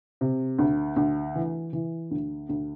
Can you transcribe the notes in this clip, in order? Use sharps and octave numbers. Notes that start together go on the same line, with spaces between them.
C3
D2
D2
E3
E3
D2
D2